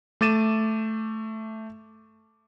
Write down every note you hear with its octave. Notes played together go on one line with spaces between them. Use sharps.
A3 D6 A6 D#7 E7